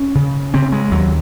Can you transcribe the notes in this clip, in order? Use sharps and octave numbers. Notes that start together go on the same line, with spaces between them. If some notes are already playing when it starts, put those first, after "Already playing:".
Already playing: C#4
C#3
C#3 C4
G#3
D#2 F#3